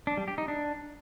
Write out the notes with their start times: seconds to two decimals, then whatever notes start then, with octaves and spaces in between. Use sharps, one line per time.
0.07 D4
0.17 G3
0.28 G4
0.38 D#4
0.48 D4